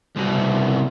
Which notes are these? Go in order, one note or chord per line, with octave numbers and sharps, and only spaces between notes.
C2 B2